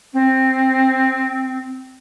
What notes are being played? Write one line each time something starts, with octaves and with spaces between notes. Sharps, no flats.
C4